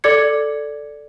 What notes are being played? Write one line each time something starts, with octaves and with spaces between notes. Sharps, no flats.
A4 D5 D6 G#6 C#7